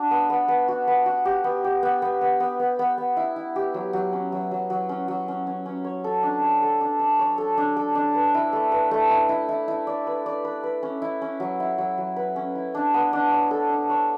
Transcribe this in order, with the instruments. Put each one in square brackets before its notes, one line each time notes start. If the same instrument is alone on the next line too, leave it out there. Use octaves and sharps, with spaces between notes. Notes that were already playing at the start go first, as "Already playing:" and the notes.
Already playing: [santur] D4 F#4
B3
B3
B3
F#4
B3
F#4
G4
B3
G4
B3
B3
B3
B3
B3
B3
B3
E4
E4
G4
F#3
F#3
C#4
F#3
F#3
F#3
C#4
F#3
C#4
C#4
C#4
C#5
A4
D4
C#5
A4
D4
D4
C#5
A4
D4
A4
D4
B4
E4
A3
B4
A3
E4
E4
E4
E4
D5
B4
D5
B4
B4
C#4
E4
C#4
F#3
E4
F#3
F#3
B4
C#4
E4
D4
B3
D4
C#5
A4
D4
C#5